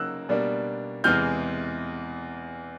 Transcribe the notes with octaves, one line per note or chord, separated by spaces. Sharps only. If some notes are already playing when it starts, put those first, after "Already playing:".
Already playing: C#3 F#3 A#3 D#4 E6 F#6
B2 G3 A#3 D4
E2 C3 E3 G#3 F6 G6